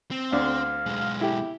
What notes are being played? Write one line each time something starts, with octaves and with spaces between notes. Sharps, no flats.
C4
D2 D4 F5
B1 G#3
E4 G4